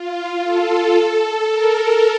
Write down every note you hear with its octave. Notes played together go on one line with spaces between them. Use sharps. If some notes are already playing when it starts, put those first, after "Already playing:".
Already playing: F4
A4
A4
A#4